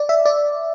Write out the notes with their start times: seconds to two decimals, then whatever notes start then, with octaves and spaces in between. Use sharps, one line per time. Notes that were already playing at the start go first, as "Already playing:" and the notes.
Already playing: D5
0.09 E5
0.25 D5